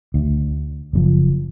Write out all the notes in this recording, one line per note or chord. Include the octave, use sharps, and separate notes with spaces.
D2
F#1 C3 F3